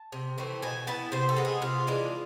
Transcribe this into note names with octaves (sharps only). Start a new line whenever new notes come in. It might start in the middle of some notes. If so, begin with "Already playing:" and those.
Already playing: A5
C3
E3 A3 C4
B2 G#5
B3 E4 A5
C3 C5
A4
G#3 B3
G#4
C3 F4
E3 G#3 D4